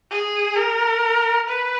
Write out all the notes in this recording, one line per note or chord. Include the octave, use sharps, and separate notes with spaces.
G#4
A#4
B4